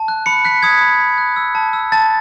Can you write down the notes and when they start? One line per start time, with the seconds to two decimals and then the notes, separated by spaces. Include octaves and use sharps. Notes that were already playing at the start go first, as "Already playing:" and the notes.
Already playing: A5
0.08 F#6
0.26 B5 C#7
0.45 F#6 B6
0.63 D#6 G#6
0.81 B5
1.01 B5
1.18 F#6
1.36 E6
1.55 A5
1.73 E6
1.92 A5 A6